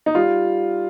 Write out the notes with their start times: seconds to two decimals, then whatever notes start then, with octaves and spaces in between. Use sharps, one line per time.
0.06 D#4
0.15 G3 F4